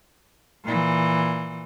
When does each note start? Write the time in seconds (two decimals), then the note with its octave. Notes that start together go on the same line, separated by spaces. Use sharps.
0.65 A#2 E3